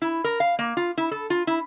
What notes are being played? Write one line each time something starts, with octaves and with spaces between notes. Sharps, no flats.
E4
A#4
F5
A#3
F4
E4
A4
F4
E4